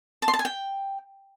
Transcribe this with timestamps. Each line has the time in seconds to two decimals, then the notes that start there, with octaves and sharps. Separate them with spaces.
0.22 A5
0.28 C6
0.34 A5
0.39 G#5
0.45 G5